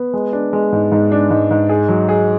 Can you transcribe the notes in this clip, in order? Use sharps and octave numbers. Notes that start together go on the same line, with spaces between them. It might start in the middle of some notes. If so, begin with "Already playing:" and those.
Already playing: B3
G#3
D4
G#3
G#2
G#2
D4
G#2
G#2
G#4
F#3
G#4